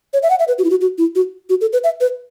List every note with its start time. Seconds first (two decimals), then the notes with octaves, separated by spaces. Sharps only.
0.13 C#5
0.23 E5
0.30 F#5
0.39 E5
0.48 B4
0.59 F#4
0.64 E4
0.70 F#4
0.81 F#4
0.98 E4
1.15 F#4
1.50 F#4
1.61 A4
1.73 B4
1.84 E5
2.01 B4